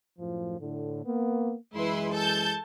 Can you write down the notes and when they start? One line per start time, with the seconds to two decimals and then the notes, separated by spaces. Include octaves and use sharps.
0.19 F#2 A2 F3
0.60 A2 D3
1.04 A#3 B3
1.74 F#2 E3 G#3 E4 B4 C6
2.12 A4 A5 G6